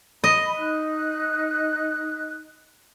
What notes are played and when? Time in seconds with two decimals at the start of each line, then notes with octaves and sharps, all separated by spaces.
0.24 D#5 B5
0.56 D#4 F#6